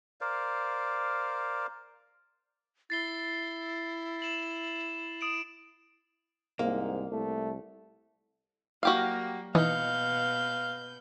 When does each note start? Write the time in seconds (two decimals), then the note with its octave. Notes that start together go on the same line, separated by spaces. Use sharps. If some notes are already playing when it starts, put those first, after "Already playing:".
0.21 A#4 C5 D5 F5
2.90 E4 A6 C7 G7
4.22 E7 F#7
5.21 D#6 D7 E7
6.59 C2 G#2 A#3
7.11 C2 A3
8.83 F#3 G3 A#3 F#4 G4 F5
9.55 B2 E3 D#4 B4 F5 G6